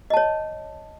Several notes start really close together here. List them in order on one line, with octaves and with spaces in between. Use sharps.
D#5 A5 C#5